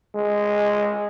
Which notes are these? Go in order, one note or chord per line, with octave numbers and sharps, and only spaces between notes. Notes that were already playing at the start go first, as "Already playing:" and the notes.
G#3